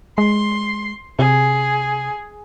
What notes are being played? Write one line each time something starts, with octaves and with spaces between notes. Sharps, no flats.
G#3 C6
C3 G#4